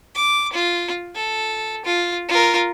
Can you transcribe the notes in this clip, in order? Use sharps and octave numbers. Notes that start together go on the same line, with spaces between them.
D6
F4
A4
F4
F4 A#4